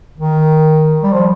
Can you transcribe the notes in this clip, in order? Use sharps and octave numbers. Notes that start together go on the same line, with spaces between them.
D#3
G3
F3